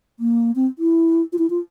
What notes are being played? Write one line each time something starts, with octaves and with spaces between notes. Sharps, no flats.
A#3
C4
E4
F4
E4
F4